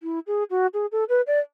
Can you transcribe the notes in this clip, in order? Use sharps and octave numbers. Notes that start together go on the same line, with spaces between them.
E4
G#4
F#4
G#4
A4
B4
D5